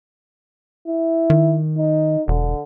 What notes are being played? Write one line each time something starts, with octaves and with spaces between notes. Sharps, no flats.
E4
D#3
D#4
E1 D3